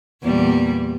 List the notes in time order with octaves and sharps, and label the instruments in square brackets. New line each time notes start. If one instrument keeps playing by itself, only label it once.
[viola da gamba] E2 A#2 G3